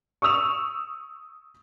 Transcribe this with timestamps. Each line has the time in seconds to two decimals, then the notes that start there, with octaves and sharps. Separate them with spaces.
0.22 C#6 D#6 E6 F7